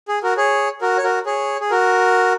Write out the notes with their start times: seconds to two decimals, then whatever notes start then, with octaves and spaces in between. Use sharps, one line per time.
0.08 G#4
0.23 F#4 A#4
0.37 G#4 C#5
0.81 F#4 A#4
0.98 C#5
1.04 F#4 A#4
1.26 G#4 C#5
1.60 G#4
1.71 F#4 A#4